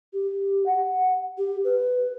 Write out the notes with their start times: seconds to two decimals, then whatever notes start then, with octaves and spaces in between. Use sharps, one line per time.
0.13 G4
0.66 F#5
1.38 G4
1.64 B4